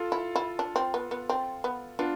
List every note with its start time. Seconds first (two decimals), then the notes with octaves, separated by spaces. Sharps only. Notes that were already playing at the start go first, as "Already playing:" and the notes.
Already playing: F4 A4
0.12 E4
0.36 E4
0.59 D4
0.76 C4
0.94 B3
1.11 B3
1.29 C4
1.64 B3
1.99 B3 D4 F4